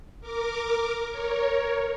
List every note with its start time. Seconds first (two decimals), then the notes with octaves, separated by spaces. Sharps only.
0.21 A#4 D6
1.10 A#4 C#5